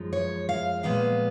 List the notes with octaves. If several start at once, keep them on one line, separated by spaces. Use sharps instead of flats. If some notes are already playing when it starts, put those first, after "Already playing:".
Already playing: F#2 F3 G#3 D#4
C#5
F5
A#2 F3 G#3 B3 F5